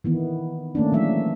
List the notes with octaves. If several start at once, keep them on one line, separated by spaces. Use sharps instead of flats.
D#3 E3 B3
D#3 A3 A#3 C#4 D4
E3 F#3 G#3 D4 E5